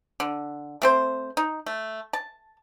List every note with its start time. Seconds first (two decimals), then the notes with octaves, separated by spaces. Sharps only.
0.20 D3
0.82 A3 C4 C5
1.37 D#4
1.66 A3
2.13 A5